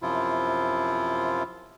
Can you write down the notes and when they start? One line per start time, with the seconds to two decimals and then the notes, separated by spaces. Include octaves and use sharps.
0.02 F#2 C3 F3 E4 F4